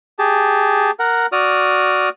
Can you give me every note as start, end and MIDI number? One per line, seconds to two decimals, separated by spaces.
0.19 0.91 67
0.19 0.91 68
0.19 0.91 81
0.99 1.26 70
0.99 1.26 78
1.32 2.09 66
1.32 2.09 74
1.32 2.09 87
1.32 2.09 89